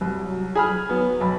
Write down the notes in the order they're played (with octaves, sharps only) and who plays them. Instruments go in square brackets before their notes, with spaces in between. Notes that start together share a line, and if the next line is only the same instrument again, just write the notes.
[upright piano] C2 [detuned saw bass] F#3
[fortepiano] G#4 [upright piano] G#5 B5 F6
[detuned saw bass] F#3 [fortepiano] B3
[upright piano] B1 B5